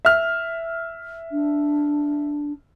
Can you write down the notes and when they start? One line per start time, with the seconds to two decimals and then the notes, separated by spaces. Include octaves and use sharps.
0.05 E5 F6
1.32 D4